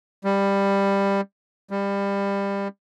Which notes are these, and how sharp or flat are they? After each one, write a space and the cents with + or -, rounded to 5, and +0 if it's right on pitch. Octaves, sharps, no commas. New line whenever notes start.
G3 +15
G3 +25